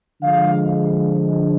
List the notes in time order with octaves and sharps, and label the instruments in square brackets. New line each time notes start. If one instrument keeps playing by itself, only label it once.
[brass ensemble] D3 F3 G#3 F5